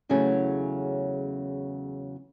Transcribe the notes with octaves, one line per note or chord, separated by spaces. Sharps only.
E2 C#3 F#3 A3 C#4